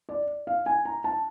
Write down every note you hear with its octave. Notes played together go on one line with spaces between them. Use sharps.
D5
F5
G#5
A#5
A5